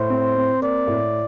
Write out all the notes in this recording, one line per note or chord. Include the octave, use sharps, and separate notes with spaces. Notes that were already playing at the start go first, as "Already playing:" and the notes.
Already playing: A2 C5
C4
C4
A#3 D5
A2